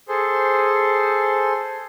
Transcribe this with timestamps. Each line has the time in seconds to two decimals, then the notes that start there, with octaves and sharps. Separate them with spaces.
0.09 G#4 A4 C5